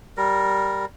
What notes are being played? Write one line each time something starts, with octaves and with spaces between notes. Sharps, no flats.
G3 A#4